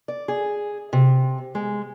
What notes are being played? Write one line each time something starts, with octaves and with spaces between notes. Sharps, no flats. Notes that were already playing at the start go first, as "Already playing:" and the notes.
D5
G#4
C3
G#3